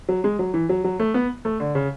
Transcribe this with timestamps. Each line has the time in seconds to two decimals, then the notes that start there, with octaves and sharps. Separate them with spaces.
0.09 F#3
0.24 G#3
0.39 F#3
0.54 E3
0.69 F#3
0.84 F#3
0.99 A3
1.14 B3
1.45 A3
1.60 D3
1.75 C#3